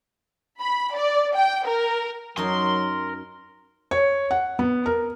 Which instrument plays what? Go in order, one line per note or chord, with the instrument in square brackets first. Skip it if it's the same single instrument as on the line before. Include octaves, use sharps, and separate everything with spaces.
[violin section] B5
D5
G5
A#4
[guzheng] F#2 D#4 [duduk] F#3 [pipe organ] A#4 [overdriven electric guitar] C6
[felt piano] C#5
F#5
B3
A#4